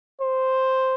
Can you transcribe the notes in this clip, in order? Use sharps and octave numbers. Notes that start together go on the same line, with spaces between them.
C5